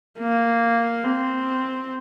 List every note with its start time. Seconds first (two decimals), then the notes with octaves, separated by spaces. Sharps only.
0.19 A#3
1.03 C4